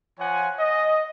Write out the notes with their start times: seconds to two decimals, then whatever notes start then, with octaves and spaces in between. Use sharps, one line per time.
0.19 F3 C#5 F#5 G#5
0.59 D#5